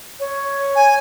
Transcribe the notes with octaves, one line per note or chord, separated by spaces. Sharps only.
C#5
G#5